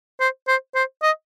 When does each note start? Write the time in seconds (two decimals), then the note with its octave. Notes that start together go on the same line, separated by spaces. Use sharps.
0.20 C5
0.48 C5
0.75 C5
1.02 D#5